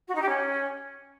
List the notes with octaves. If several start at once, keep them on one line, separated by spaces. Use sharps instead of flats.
F#4
D#4
G4
C#4